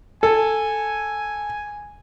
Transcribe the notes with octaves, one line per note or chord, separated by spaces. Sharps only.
A4 G#5